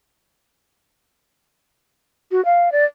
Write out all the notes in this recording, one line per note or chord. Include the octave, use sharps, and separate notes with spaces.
F#4
F5
D5